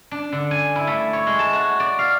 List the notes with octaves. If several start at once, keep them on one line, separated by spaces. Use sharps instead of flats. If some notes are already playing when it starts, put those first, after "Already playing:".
D4
D3
G#5
E4
A3
C#5
G#3
A5
F#4
D5
F5